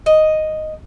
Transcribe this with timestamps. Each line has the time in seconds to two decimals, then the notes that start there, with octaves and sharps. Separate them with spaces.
0.06 D#5